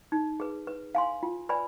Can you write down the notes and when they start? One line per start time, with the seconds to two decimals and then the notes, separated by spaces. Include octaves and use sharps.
0.12 D#4
0.40 G#4 B4
0.67 B4
0.95 F5 G#5 C6
1.23 F4
1.49 B4 D5 G#5 B5